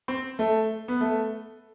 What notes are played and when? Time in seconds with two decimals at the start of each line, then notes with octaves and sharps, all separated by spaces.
0.08 C4
0.39 A3
0.88 B3
1.01 A3